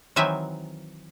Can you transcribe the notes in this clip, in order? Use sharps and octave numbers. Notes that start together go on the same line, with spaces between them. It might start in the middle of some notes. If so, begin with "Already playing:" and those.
D#3 E3 F#3 C4 E5 G#5